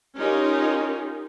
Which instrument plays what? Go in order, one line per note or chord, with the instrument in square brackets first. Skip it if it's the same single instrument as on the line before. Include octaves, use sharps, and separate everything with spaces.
[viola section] C#4 D#4 F4 G4 A#4